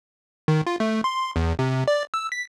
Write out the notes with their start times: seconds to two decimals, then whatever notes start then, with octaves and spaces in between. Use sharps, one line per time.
0.48 D#3
0.67 F4
0.80 A3
1.04 C6
1.36 E2
1.59 C3
1.88 D5
2.14 E6
2.32 B6